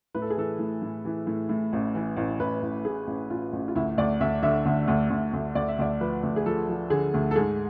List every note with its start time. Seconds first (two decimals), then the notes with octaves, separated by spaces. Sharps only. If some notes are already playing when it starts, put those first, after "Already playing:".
0.15 A2 B4
0.22 A4
0.30 G#4
0.37 E3 A4
0.59 A2
0.82 A2
1.05 E3
1.27 A2
1.49 A2
1.73 A1
1.95 E3
2.17 A1
2.40 A1 B4
2.62 A1
2.85 A2 G#4
3.07 A1
3.30 A1 F4
3.53 A1
3.68 F4
3.75 D2 E4
3.98 D2 D5
4.21 D2 E5
4.43 D3 E5
4.65 D2
4.88 D2
5.10 D2
5.33 D2
5.55 D2 D5
5.68 E5
5.79 D2 D5
6.00 F3 B4
6.23 D2
6.36 G#4
6.46 F3 A4
6.69 F3
6.90 D3 G#4
7.14 D2
7.31 A4
7.36 G#2 G#4